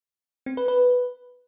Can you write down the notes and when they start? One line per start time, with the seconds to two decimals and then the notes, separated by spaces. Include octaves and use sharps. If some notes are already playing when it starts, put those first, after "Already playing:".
0.46 C4
0.57 B4
0.68 B4